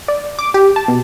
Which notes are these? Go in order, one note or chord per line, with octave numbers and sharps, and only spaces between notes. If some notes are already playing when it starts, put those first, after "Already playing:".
D5
D6
G4
A5
B2